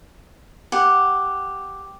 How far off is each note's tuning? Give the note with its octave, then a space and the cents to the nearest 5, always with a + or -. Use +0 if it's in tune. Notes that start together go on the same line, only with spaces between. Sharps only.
G4 +0 F#5 +0